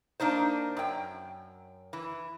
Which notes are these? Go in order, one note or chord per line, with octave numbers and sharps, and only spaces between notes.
A#3 D4 D#4 C5
F#2 G5
E3